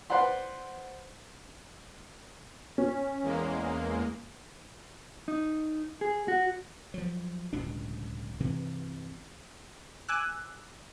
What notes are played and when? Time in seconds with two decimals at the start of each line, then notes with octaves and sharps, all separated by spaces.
0.10 B4 C5 D5 F#5 C6
2.78 C#4
3.23 E2 G#3 A#3
5.28 D#4
6.01 G#4
6.28 F#4
6.94 F3 F#3
7.53 D1 C#2 B2 D4
8.40 G2 C3 E3
10.09 G#5 D6 E6 F#6